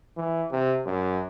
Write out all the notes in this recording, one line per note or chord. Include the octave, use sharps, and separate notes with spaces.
E3
C3
F#2